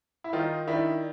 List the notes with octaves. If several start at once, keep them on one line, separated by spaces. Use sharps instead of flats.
E4
D#3 D#4 F4
D#3 D4 E4